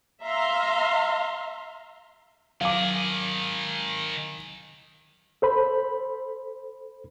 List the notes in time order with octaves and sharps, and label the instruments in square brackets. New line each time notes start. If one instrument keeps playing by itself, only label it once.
[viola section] E5 F5 A#5 C6
[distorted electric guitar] D#3 G#4 [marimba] F#3 [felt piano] F5 D6
[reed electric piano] A4 C5 B5